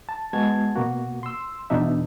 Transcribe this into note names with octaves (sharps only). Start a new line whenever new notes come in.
A5
G#3 B3 F#4 A5 G#6
B2 A#3 F#4
C6 E6
E2 B2 D4 D#4 E5